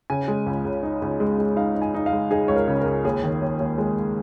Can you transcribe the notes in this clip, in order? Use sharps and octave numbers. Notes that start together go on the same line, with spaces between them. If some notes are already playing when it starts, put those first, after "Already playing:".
C#3 G#5
G#3
C#2
C#2
D#4
C#2
G#3
G#3
D#4 F5
D#4
G#5
D#4
F5
G#3
D#4 G#4
C#2 C#5
A#4
C#3
A#4
C#2
D#2 G#4
D#3
D#2
D#2
G#3